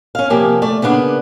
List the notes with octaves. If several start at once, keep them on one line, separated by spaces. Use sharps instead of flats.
C#4 F5
C3 F3 A#3 G4 G#5
A3 D5
C#3 A#3 B3 D4